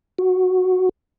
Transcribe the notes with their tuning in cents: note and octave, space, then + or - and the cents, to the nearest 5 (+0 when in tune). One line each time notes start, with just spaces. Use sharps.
F#4 -5